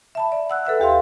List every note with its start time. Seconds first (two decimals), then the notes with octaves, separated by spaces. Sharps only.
0.15 E5 A5 B5
0.32 D5
0.50 F#5 E6 F#6
0.65 A4 B4 E5 F#5
0.80 D#2 G4 F5 C6